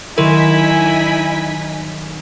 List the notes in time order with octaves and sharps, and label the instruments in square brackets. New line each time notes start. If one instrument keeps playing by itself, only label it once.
[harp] D#3 F#3 C6 [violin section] D#4 G#5 B6 [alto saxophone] E4 [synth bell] A#4